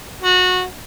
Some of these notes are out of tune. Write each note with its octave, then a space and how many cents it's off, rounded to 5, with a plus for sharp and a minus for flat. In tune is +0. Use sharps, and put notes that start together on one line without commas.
F#4 -20